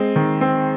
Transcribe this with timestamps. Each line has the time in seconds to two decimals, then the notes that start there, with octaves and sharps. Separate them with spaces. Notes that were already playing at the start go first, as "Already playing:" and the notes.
Already playing: G#3 C4
0.16 D#3
0.41 C4